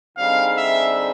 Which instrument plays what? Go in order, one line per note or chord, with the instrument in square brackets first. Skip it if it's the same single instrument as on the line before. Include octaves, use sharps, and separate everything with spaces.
[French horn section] D3 G3 C4 D#4 G#4 [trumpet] F5
[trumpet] E5